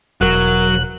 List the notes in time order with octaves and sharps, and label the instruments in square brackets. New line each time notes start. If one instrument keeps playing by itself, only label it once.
[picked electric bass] E1 [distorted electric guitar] F#3 [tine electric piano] F#4 A#4 [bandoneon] F#6